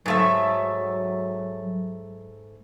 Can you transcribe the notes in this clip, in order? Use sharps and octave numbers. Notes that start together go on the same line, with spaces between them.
G#2 F#3 A3 E5